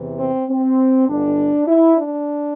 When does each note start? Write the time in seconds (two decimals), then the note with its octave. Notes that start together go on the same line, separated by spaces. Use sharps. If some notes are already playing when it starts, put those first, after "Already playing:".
Already playing: E2 C3 E3
0.19 C4
0.49 C4
1.08 G1 G2 D3 D4
1.67 E4
1.96 D4